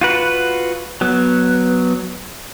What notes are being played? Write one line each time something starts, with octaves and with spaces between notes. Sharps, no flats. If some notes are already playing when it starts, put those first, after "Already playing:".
F4 F#4 B4
F#3 B3